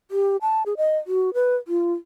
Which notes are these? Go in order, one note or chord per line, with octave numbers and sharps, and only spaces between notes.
G4
A5
G#4
D#5
F#4
B4
F4